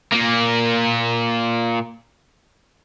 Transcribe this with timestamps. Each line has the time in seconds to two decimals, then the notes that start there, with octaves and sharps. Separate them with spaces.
0.12 A#2 A#3